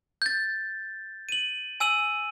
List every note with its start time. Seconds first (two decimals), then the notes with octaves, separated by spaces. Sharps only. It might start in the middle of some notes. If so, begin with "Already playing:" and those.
0.22 G6 A6
1.29 D#7 F#7
1.80 G#5 E6 D#7 F#7